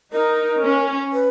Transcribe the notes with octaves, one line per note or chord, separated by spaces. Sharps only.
D#4 A#4
C#4
B4